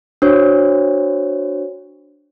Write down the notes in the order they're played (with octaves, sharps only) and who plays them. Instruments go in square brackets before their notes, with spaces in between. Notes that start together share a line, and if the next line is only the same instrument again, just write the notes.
[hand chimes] D4 F#4 C5 C#5